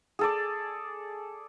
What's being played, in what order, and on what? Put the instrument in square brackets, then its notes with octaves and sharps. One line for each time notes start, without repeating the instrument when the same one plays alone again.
[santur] G#4 A4 D5